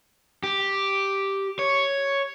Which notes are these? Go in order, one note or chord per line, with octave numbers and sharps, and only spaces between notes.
G4
C#5